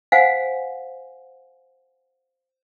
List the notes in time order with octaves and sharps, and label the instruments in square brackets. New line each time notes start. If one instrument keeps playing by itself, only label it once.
[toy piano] C5 F5 F#5 G#5